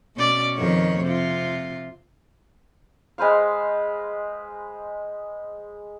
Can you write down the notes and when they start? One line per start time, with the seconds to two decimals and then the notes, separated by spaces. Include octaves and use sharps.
0.16 B2 C#4 D5
0.55 F2 D#3 C#5
1.03 C3 F4
3.18 G#3 B4 C5 F5